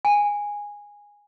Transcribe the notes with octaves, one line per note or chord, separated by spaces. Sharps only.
G#5